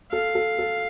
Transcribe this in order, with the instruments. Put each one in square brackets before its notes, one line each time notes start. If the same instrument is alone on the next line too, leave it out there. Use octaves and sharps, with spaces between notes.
[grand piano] A4 [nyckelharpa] F5
[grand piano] A4
A4